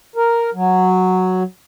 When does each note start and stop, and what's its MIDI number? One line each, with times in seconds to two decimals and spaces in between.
0.16 0.50 70
0.54 1.43 54